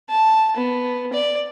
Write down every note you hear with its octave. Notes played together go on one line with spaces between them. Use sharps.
A5
B3
D5